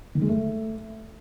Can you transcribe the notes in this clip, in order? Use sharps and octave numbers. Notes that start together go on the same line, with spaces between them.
D#3
G#3
A3